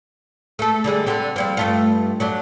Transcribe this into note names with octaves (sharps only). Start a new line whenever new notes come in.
A3 A4
D3 G3 G#3
D3 G3 C4
F3 G3 C4
G2 A3 F4
F#3 A3 D4